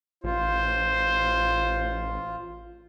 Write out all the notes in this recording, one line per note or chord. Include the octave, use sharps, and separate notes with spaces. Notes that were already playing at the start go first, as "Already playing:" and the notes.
A1 F4 C5